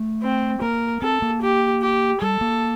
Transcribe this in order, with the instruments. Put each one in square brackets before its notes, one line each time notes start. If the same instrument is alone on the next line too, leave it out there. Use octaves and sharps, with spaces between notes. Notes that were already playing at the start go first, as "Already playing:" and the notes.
Already playing: [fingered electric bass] A3
[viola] C4
[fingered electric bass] A#3 [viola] A#4
[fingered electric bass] C4 [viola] A4
[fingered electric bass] A#3
[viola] G4
G4
[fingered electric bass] G3 [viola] A4
[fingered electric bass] A#3